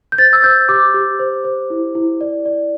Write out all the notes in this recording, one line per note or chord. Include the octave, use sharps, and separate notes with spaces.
G6
C5 A6
E6
C5 G6
G4 D6
G4
C5
C5
E4
E4
D5
D5